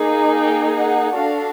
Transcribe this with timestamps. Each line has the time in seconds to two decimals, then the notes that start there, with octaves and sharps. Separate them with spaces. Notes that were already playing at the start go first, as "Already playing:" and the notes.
Already playing: A#3 D#4 G#4
0.35 G5
0.74 F#5
1.14 D4 F#4 A4 F5